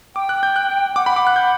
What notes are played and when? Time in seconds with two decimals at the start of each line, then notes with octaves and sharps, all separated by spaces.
0.15 G5 D6
0.29 F#6
0.43 G6
0.56 F#6
0.96 F#5 D6
1.05 G5 B5
1.13 F#5 D6
1.27 F#6
1.36 G6